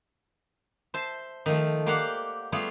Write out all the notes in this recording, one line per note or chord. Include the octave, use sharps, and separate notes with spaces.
C5 E5 A5
D#3 F3 A3
A#3 G4 C5 D5 F5 F#5
G3 A3 B3 F4 G#4 F5